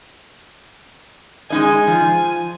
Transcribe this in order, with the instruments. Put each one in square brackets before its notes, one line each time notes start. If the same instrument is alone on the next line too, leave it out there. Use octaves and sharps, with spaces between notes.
[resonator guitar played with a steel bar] G#3 D#4 D#5 [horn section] G#5
[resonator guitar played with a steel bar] F3